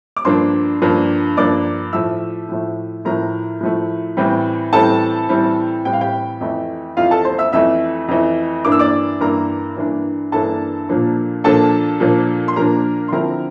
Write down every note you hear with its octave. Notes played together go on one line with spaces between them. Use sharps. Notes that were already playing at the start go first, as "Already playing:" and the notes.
D6
G2 F3 A#3 D4 C5 C6
G2 F3 A#3 D4
G2 F3 A#3 D4 D5 D6
A2 F3 A3 E5 E6
A2 F3 A3
A2 F3 A3 A#4 A#5
A2 F3 A3
A2 E3 G3 C4
A2 E3 G3 C4 A4 A5
A2 E3 G3 C4
A2 E3 G3 C4 G5
F5
G4 G5
F2 E3 A3
F2 E3 A3 F4 F5
A4 A5
C5 C6
E5 E6
F2 E3 A3 E5 E6
F2 E3 A3
G2 E3 A#3 D4 D6
E6
D5 D6
G2 E3 A#3 D4 A#4 A#5
G2 E3 A#3 D4
G2 E3 A#3 D4 A4 A5
A#2 F3 A#3 D4
A#2 F3 A#3 D4 A4 A5
A#2 F3 A#3 D4
C6
A#2 F3 A#3 D4 A#4 A#5
C6
D3 F3 C4 E4 A#4 A#5